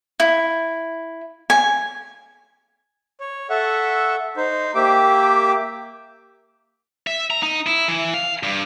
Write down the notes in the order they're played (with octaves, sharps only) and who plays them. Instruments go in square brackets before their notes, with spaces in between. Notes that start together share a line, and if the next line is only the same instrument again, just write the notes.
[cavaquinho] E4
G#5
[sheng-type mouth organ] C#5
A4 E5 F#5 C#6
D#4 C5
A#3 G4 E5 G5 D6
[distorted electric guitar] E5
A#5
D#4
E4
E3
F5
G2